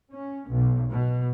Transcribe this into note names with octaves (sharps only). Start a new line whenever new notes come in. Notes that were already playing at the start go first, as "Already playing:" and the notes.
C#4
B1
B2